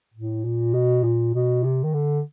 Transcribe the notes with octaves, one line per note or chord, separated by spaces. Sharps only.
A2
A#2
B2
A#2
B2
C3
D#3
D3